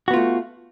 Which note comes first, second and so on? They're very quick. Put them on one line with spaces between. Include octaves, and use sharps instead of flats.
F#4 B3 F4 A3